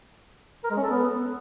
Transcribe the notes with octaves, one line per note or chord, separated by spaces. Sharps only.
A#4
G#3
C#4
A4
B3